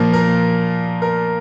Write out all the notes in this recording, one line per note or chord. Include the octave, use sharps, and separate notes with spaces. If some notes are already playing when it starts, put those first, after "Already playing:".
Already playing: A#2 F3 A#3 A#4
A#4
A#4